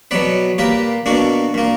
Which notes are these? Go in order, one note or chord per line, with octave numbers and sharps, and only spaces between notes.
B2 F#3 B3 B4 D5
A#2 A#3 G4 B4
B2 A#3 D4 F#4
A#2 A#3